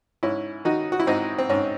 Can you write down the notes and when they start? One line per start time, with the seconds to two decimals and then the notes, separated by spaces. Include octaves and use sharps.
0.23 G#2 C#4 E4
0.65 D#3 D#4 F#4
0.92 F#4
1.00 E4
1.07 G#2 C4 D#4
1.38 C4
1.49 G#2 C#4